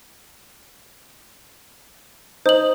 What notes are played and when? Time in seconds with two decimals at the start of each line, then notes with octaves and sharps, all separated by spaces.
2.46 D#4 C5 F#7